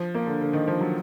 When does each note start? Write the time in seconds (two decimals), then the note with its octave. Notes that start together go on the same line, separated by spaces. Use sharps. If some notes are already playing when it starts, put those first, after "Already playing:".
Already playing: F3
0.15 A#3
0.27 D3
0.41 D3
0.53 D#3
0.68 F3
0.81 F#3